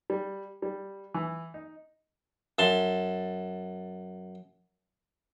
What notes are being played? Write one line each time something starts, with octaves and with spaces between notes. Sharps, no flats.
G3
G3
E3
D#4
F#2 A5 C6